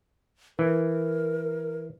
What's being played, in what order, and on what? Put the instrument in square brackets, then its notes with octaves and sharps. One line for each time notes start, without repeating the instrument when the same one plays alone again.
[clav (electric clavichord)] E3 [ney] A#4